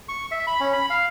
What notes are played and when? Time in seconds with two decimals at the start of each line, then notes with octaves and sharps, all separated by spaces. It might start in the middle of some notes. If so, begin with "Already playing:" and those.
0.09 C#6
0.32 E5
0.47 B5
0.60 C#4
0.73 B5
0.90 F5